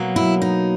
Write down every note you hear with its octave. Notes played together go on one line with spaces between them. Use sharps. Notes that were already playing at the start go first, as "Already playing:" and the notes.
Already playing: B2 F#3 A#3
E4
D#4